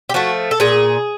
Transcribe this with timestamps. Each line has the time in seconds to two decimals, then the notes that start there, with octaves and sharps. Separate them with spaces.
0.10 G4
0.14 F3 A3 F#4
0.51 A4
0.60 A#2 G#4